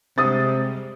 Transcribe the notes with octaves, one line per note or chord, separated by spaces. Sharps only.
C3 G3 G#3 D#6 A6